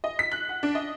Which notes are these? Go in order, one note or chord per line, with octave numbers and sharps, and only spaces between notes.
D#5
B6
F#6
F#5
D4
D#5